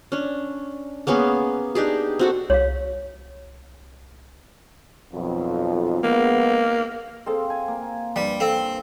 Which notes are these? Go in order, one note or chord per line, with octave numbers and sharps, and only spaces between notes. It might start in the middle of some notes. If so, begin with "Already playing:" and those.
C#4 D4
A#3 B3 C#4 G#4
D4 D#4 G4 G#4
C4 F#4 A4
C2 C#5 F5
B1 F2
G#3 A#3 B3
C4 G#4 A4 C5 F5
G#5
A#3
G2 G3 B4
C4 A4 F5